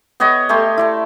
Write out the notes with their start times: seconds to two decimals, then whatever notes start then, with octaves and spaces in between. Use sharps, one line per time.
0.20 B3 G4 C#5 D#5
0.49 A3 G4 C#5 C6
0.77 E4 D5 A5